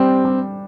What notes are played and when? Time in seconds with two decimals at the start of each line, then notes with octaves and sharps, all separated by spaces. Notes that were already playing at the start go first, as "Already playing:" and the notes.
Already playing: G3 C4 D4
0.25 G3